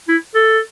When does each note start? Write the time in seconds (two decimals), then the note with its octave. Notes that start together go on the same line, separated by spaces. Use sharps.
0.08 E4
0.35 A4